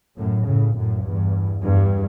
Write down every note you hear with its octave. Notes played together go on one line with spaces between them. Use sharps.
F#2 A2
A2 C#3
F#2 A2
E2 G2
E2 G2